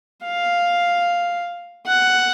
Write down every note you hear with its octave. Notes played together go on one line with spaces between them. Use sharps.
F5
F#5